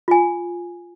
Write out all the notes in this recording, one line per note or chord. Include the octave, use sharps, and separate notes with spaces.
F4 G#5